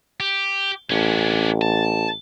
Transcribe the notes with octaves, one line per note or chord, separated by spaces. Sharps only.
G4
A1 C#4 D4
A5